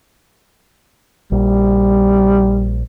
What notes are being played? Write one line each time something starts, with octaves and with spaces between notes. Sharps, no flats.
A#1 G3